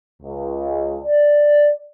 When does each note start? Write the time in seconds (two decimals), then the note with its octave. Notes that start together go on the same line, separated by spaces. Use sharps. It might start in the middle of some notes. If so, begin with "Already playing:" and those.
0.23 C#2
1.04 D5